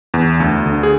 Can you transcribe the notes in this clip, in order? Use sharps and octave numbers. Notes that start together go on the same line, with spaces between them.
E2
D2
D3
G#4